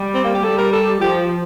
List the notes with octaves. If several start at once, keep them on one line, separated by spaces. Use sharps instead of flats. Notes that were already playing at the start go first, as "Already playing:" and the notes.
Already playing: G3
C4
A#3
G4
G3 A4
A#4
A4
F3 G4